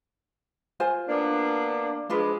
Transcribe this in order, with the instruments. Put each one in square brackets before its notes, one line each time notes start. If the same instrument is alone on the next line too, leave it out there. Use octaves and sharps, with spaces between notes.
[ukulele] F4 C5 G#5
[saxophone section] A#3 B3 D4
[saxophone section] F3 G#3 [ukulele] D4 F4 B4